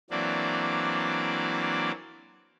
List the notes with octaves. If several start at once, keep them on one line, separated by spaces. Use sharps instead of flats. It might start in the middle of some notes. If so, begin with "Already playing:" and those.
E3 F#3 A#3 C4 D4 D5